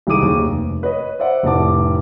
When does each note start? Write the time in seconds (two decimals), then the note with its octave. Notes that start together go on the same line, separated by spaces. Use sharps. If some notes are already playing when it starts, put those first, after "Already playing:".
0.07 C2 D#3 G#4 D6 D#7
0.22 F#1 D#2
0.45 F1
0.83 B4 C#5 D#5
1.19 C5 D5 E5 F#5
1.43 F1 A2 C3 A5 D6